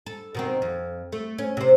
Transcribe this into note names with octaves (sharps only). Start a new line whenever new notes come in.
A4
B2 D#3 C4
F2
A3
C#4
C3 C5